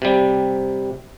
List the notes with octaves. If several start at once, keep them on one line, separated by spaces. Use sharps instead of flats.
C3 G3